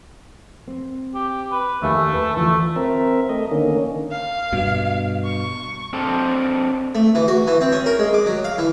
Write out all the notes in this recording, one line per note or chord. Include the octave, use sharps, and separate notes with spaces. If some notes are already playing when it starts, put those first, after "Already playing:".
C4
G4
B4
D#2 A3 E5 G#5
B4
D2 E3 A3 F4
C4 A#4 E5
A3 D#5
D3 D#3 A#3 C#4
F5
G2 B2
C#6
C4 D4 A4
A3
E3
F#4
E3
C4
C#4
A#4
G#3
D6
F#3
F5
E3